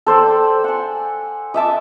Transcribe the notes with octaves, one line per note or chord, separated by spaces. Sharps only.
A4 C5 D5 G5
F#5 G#5
D#5 E5 A5 D6